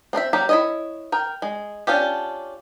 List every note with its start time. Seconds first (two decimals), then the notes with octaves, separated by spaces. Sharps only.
0.13 C4 D4 C5 E5
0.33 F#3 A#3 G4
0.49 E4 C#5 D#5
1.12 A#4 G5
1.42 G#3
1.87 C#4 D4 F4 G4